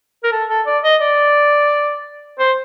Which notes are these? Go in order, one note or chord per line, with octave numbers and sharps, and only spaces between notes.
A#4
A4
A4
D5
D#5
D5
C5